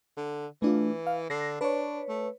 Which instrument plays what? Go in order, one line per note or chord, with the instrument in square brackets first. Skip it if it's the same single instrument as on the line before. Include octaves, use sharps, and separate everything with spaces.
[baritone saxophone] D3
[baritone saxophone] E3 [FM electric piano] A3 D4 F4
[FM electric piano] F5
[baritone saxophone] D3 [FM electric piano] A#6 C7
[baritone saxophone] D4 [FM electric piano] B4 C#5
[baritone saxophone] A3